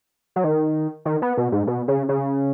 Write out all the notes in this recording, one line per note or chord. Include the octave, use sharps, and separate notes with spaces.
F#3
D#3
D#3
B3
B2
G#2
B2
C#3
C#3